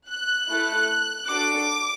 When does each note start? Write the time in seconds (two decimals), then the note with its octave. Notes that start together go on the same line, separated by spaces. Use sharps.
0.09 F#6
0.49 A3 E4 A4
1.29 D4 F#4 A4 D6